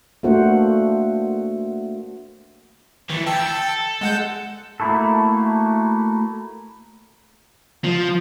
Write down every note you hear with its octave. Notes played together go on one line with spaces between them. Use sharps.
A3 A#3 D4 F#4 C5 F#5
D#3 E3 A3
D2 G5 A5 E6
A4
G#3 F#5 G6
A3 A#3 E4 F#4 A4
F3